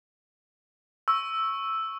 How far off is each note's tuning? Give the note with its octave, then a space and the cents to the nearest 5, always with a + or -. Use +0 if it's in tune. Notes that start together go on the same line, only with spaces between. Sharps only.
C#6 -10 E6 +0